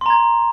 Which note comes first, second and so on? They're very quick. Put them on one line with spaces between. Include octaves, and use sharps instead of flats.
C6 A#5 G#6